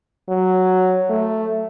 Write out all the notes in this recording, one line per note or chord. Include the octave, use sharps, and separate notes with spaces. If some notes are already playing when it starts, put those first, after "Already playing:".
F#3
A3